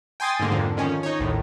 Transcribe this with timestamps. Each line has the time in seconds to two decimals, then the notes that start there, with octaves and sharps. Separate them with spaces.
0.20 G5 G#5 C6 D#6 A6
0.39 G#2 D3 A#3
0.52 F2 D3
0.77 D#3 F3 C#4
1.03 D#4 C#5
1.19 A#1 D#2 A2